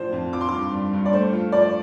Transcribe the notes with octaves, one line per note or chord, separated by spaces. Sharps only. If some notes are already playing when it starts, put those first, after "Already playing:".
Already playing: A2 F3 D4 F4 C5
F2
F4 D6
C6
G2 D6
G3
G2
D5
A3 C5
F4
F3 D5